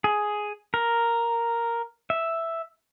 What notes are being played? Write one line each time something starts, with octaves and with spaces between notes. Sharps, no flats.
G#4
A#4
E5